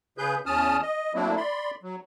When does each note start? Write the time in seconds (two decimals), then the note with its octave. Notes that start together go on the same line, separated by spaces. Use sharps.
0.18 C#3 G#4 B4 G6
0.46 E2 C#4 A5 D#6 F6
0.82 D#5
1.15 F#3 A3 A#3 C4 D4 E4
1.37 D5 B5 C6
1.83 F#3